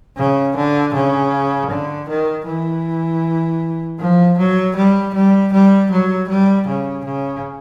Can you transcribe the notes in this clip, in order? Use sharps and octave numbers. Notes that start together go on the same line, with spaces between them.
C#3
D3
C#3
D3
D#3
E3
F3
F#3
G3
G3
G3
F#3
G3
C#3
C#3